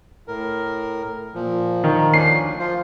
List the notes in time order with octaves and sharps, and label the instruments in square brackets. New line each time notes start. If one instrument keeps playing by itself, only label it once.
[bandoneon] A2 A#4
A#2 F3
[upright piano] D#3
[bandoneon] F3 C#4 D4 [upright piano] C7
[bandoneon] D2
F3 F4 C5